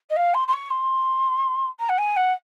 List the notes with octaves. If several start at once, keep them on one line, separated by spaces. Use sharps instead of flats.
D#5
F5
C6
C6
C#6
C6
A#5
F#5
G#5
F#5